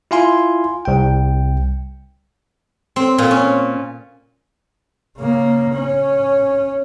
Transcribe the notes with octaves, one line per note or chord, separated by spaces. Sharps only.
E4 F4 F5 G#5 C6
C2 G5
C4
A#2
C#4
C#3 A#3
C#4